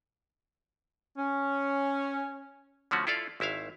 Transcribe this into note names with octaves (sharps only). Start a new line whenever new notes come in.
C#4
D3 F3 A3 C#4 F#4
E4 F4 A4 D5 F5
G#1 E4 E5 F5